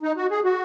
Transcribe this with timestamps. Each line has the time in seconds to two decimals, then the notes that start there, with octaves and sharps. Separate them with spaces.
0.03 D#4
0.17 F#4
0.31 G#4
0.44 F#4